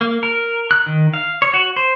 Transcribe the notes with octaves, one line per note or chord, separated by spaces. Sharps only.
A#3
A#4
F#6
D#3
F5
C#5
F#4
C5